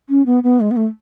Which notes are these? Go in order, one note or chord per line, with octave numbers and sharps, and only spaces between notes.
C#4
B3
B3
G#3
B3
A3